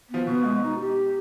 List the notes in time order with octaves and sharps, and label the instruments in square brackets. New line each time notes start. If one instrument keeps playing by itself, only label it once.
[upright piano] F3 [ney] B3
[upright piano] B2 [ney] B3
[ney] G#3
D#4
G4